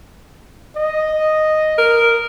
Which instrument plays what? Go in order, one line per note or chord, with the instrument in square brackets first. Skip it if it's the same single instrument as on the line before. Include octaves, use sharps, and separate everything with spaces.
[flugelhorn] D#5
[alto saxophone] A#4